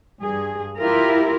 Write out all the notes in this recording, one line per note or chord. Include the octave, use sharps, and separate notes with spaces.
G2 G#4
E4 F4 G4 A#4